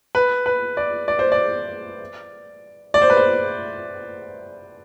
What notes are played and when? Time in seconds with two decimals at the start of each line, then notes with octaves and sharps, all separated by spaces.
0.15 B4
0.46 B4
0.77 D5
1.08 D5
1.19 C5
1.32 D5
2.94 D5
3.02 C5
3.10 B4
3.17 C5